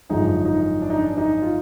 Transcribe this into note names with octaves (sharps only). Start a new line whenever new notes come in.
G#1 F#2 D3 F3 G#3 D#4
D#4
D4
D#4
D4
D#4
F4